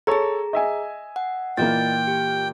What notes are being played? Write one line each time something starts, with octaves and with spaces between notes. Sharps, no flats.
G#4 A4 C#5 A#5
D#5 E5 G#5
F#5
A#2 E3 A#3 D#5 G5 A6
G4